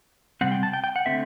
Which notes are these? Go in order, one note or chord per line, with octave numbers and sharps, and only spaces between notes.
C3 G3 C4 F#5
G5
A5
G5
G5
F#5
D3 A3 C4 E5